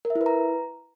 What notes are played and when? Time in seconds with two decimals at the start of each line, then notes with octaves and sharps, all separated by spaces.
0.05 A#4
0.10 E5
0.15 E4
0.21 B4
0.26 A#5